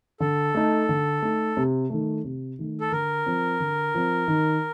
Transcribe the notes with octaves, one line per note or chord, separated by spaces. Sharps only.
D3 A4
A3 D#4
D3
A3 D#4
C3
D#3 A3
C3
D#3 A3
A4
D3 A#4
F3 C4
D3
F3 C4
D#3